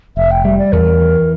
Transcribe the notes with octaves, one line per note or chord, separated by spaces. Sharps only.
F1 E5
G5
G3 E5
D5
E2 A#4
E3